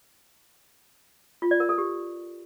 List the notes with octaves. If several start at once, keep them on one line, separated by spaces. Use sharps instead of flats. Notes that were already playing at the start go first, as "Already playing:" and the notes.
F4
D5
A#4
A4
G4